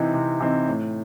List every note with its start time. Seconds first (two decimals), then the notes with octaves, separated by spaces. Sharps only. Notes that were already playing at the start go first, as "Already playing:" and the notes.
Already playing: C3 E3 C4 D#4
0.14 C3
0.40 E3 C4 D#4
0.68 A2